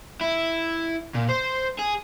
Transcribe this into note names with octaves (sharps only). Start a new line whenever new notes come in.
E4
A#2
C5
G#4